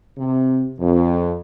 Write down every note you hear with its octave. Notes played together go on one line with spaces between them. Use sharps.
C3
F2